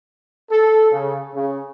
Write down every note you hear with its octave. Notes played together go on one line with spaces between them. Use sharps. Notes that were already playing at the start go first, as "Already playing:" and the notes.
A4
C#3
C#3